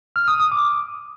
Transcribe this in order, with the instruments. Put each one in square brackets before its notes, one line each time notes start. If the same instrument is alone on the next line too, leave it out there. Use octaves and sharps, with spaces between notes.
[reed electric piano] F6
D#6
D#6
D6